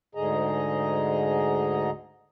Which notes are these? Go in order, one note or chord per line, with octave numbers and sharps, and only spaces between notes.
D2 G#2 D3 G#4 D#5 A#5